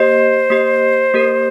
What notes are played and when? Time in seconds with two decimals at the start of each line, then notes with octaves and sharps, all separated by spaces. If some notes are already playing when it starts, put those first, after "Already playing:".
Already playing: A#3 G4 C5 D#5
0.50 A#3 G4 D#5
1.14 A#3 G4 A#4